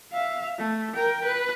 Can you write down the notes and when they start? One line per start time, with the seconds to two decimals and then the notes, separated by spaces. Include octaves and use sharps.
0.13 E5 F5
0.58 A3
0.95 A#4 G5
1.25 B4